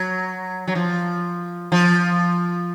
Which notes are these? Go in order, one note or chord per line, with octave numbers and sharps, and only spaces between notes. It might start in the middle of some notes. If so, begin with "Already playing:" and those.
Already playing: F#3
F#3
F3
F3